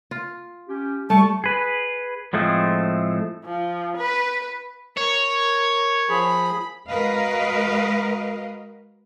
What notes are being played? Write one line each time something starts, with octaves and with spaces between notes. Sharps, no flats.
F4
C#4 G4
G3 A3 A5 C#6
G#4 B4
A2 F3 G#3 A3 C4
F3
B4
A#4 C#5
F3 G#4 B5
G#3 F#4 A#4 B4 D#5 F5